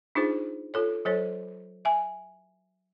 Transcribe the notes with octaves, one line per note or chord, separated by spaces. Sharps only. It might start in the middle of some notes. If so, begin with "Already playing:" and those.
D4 D#4 F4 G#4 C5
F4 A4 C#5
F#3 A4 C5 C#5
E5 G#5